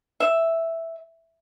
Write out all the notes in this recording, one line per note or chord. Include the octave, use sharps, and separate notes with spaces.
E5